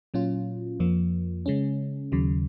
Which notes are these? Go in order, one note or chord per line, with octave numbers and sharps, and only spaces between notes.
A#2 F#3 C#4 F4
F2 F3 A#3
C#3 G#3 C#4
D#2 C#3 F#3